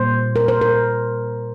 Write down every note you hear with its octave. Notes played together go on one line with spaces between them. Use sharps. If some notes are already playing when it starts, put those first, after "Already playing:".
Already playing: A#2 G3 A#3 C5
A#4
C5
A#4